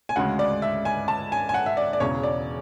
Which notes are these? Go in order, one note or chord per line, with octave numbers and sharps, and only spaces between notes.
G#5
D2 C#3 G#3 F#5
D5
E5
G#5
A5
G#5
G#5
F#5
E5
D5
D5
E1 E2 C#3 C#5
D5